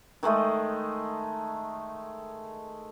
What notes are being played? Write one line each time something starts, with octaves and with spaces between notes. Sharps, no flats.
D#3 G#3 A3 D#5